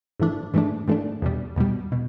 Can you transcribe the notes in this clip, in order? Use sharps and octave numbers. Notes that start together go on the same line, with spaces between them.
G#2 E3 A3 D4
G#2 E3 A3 D4
G#2 E3 A3 D4
E2 B2 G3
E2 B2 G3
B2